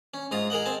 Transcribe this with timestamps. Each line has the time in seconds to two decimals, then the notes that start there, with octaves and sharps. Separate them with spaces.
0.14 C#4
0.31 G#2 F4 A#5 D#6
0.50 G#4 A#4 D#5 F#5
0.66 C4 G#5 A5